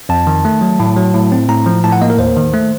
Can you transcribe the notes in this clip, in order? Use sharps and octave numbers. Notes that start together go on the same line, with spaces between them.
F2 A5
D#3
A3
F#3
A2
F#3
A2
C4
A2 A#5
F3
A2 A5
F#5
A#3 D#5
A#4
D#2 C5
D#3
A3